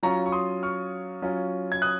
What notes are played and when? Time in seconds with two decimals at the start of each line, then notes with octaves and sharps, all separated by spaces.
0.03 F#3 C#4 F4 A#5 C#6
0.26 C#6
0.32 C6 D#6
0.63 C#6 F6
1.22 F#3 C#4 F4
1.72 G#6
1.82 D#6 F#6